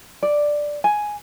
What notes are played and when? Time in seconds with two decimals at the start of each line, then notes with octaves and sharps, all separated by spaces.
0.23 D5
0.84 G#5